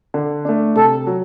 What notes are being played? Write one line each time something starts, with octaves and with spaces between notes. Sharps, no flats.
D3
A3 D4
C3 A4
F#3